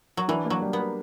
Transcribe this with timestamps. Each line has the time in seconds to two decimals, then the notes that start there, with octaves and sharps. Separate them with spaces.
0.17 F#3
0.28 E3 D4
0.45 A#3
0.50 F#3
0.62 G3
0.73 B3
0.79 A#4